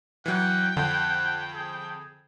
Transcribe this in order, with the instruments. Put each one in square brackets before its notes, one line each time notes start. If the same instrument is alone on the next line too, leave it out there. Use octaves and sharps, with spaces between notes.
[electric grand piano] E3 F#3 [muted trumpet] F#5 [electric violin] G5
[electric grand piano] F2 [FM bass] D3 [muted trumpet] F#5
[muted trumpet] G#4